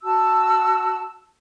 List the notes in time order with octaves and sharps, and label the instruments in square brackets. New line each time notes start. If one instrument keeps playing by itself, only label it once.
[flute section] F#4 A5 E6